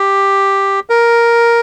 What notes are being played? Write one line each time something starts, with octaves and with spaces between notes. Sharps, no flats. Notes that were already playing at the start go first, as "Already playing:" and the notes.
Already playing: G4
A#4